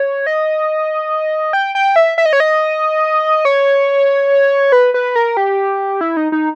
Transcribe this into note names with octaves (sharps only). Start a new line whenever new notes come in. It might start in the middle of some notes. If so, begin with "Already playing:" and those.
Already playing: C#5
D#5
G5
G5
E5
E5
D#5
C#5
D#5
C#5
B4
B4
A#4
G4
E4
D#4
D#4